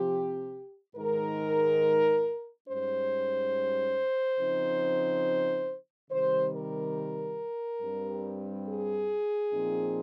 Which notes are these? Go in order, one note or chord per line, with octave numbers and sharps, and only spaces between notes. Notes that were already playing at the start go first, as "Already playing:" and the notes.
Already playing: C3 F3 C4 G4
G#2 D#3 G#3 D#4 A#4
G#2 G3 C#4 C5
C#3 F3 C4 D#4
C3 D#3 G3 C5
A#4
G2 G3 C4
G#4
A#2 F3 C4 D#4